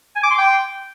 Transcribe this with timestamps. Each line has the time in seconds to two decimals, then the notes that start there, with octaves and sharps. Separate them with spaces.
0.16 G#5
0.23 D6
0.31 C6
0.38 G5